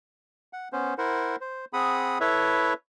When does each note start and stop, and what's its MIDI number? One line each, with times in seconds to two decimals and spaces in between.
0.53 0.69 78
0.73 0.94 59
0.73 0.94 61
0.73 0.94 72
0.98 1.36 64
0.98 1.36 70
0.98 1.36 72
0.98 1.36 78
1.41 1.65 72
1.73 2.18 60
1.73 2.18 68
1.73 2.18 78
1.73 2.18 83
1.73 2.18 87
2.20 2.74 64
2.20 2.74 69
2.20 2.74 71
2.20 2.74 73
2.20 2.74 76